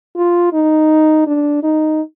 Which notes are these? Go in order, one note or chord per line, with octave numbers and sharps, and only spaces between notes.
F4
D#4
D4
D#4